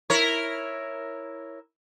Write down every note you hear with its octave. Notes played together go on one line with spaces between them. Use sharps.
E4 A#4 C#5